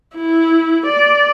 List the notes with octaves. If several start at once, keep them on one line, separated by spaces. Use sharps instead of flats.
E4
D5